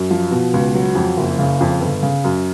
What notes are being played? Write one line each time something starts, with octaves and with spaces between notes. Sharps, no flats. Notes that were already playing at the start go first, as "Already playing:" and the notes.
Already playing: F#2
F3
B2
C#2
F#3
F2
F#1
C#3
F2
G1
C#3
F#2